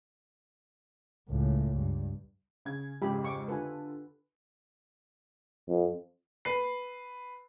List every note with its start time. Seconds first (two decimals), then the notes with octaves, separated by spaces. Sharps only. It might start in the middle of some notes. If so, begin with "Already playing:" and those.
1.29 C#2 A2
1.76 G2
2.65 C#3 G#6
3.02 F2 G#2 C#3 G4 B5
3.24 C#6 D6
3.48 D3 F4 A4 B4 G#5
5.68 F2
6.45 B4 C7